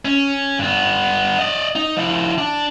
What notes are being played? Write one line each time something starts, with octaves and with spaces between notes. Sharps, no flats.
C#4
G2 B3
D5 D#5
D#4
F3 E4
D4